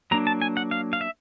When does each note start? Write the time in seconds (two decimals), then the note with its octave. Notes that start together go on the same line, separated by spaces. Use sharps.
0.11 F#3 A#3 D4 A#5
0.27 A5
0.42 G#5
0.57 F#5
0.71 F5
0.93 F5
1.01 E5